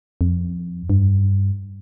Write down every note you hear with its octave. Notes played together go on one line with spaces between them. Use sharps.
F2
G2